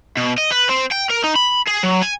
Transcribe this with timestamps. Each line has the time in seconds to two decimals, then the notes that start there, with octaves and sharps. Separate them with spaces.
0.17 B2
0.38 D#5
0.52 B4
0.69 C4
0.91 G5
1.10 A#4
1.24 D#4
1.36 B5
1.68 G#4
1.83 F#3
2.03 G#5